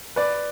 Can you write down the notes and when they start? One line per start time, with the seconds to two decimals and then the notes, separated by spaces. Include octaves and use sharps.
0.16 B4 D5